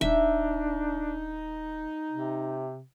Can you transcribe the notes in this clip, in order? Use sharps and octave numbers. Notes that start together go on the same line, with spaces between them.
D#1 D4 D#4 E5
C3